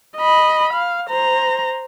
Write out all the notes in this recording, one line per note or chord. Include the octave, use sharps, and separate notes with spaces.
D#5 B5
F5
C5 A#5